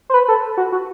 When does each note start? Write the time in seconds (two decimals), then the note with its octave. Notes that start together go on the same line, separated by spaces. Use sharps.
0.10 C5
0.14 B4
0.28 A4
0.57 F#4
0.72 F#4